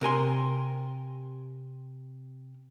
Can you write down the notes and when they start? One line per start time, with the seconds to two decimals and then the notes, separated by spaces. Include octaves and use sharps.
0.01 C3 A#4 G#5 C6